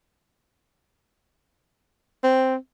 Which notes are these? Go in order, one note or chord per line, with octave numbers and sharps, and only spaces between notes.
C4